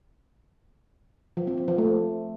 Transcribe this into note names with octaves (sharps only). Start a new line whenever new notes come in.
F3
C4
C4
F3
A3